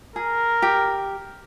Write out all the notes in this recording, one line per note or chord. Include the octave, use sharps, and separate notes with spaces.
G#4 A#4
G4